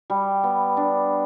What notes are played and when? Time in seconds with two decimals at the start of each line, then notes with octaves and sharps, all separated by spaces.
0.10 G3
0.44 B3
0.77 D4